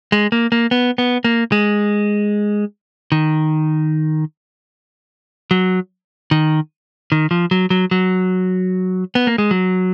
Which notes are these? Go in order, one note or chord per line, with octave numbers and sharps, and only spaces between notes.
G#3
A#3
A#3
B3
B3
A#3
G#3
D#3
F#3
D#3
D#3
F3
F#3
F#3
F#3
B3
A#3
G#3
F#3